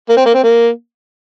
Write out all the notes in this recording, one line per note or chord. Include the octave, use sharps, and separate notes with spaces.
A#3
C4
A#3
C4
A#3